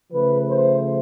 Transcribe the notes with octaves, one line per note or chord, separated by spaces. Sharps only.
C#3 F3 A3 B4
C5